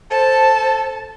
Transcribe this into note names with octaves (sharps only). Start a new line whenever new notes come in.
A4 C5 A5